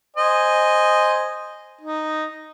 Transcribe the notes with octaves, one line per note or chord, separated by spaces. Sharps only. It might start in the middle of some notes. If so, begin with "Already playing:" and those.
C5 D#5 G#5
D#4